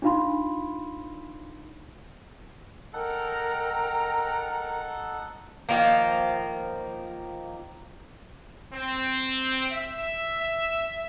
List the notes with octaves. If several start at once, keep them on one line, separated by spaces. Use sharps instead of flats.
D4 D#4 F4 F5 B5 C6
D#4 A4 A#4 F#5 G5 A#5
D#3 F3 A#3
C4
E5